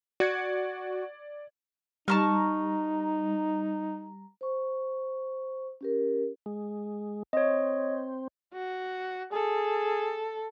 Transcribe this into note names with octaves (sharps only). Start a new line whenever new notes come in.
F#4 D5 G#6 C#7
G3 D#4 A5 A#5 C#6 F6
C5 C#6
C#4 G4 A#4
G#3
C4 C#5 D#5
F#4
G#4 A4